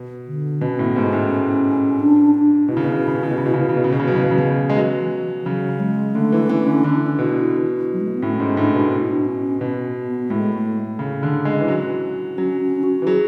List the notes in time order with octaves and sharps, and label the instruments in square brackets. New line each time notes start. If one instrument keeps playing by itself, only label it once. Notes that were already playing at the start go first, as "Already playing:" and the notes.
Already playing: [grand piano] B2
[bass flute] D3
[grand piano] B2 [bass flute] C#4
[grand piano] A2
[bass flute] B3
[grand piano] G#2
[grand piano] A2 [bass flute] C#4
[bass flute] D4
D4
[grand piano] B2 [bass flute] E4
[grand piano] C#3
B2
C#3
B2
C#3
B2
C#3
B2
C#3
B2
C#3
B2
C#3
B2
C#3
B2
C#3
[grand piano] B2 [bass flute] F#3
[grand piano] C#3
B2
[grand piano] C#3 [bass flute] E3
[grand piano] B2
[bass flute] E3
[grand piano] G#3
F#3
[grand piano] C#3 [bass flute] F#3
[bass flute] G#3
[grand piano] D3 [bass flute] A3
[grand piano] E3
[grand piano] E3 [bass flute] C#4
[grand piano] D3
[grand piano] D3 [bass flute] E4
[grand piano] B2
[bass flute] F#3
G#3
A3
B3
[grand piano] A2 [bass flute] C#4
[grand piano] G#2
[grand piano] A2 [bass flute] D4
[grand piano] B2
[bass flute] D4
E4
D4
C#4
[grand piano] B2 [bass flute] B3
[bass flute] B3
[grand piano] A2 [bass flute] G#3
[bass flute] A3
[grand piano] C#3
D3
G#3
E3
F#3
[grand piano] F#3 [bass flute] C#4
[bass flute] C#4
F#4
[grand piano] E3
[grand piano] F#3 [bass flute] G#4